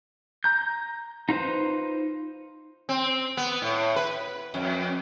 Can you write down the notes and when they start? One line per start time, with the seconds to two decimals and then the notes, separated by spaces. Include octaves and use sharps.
0.44 A#5 G6
1.29 D#4 F4 B4 C5
2.89 C4
3.37 B3
3.62 A2
3.96 B4
4.54 F2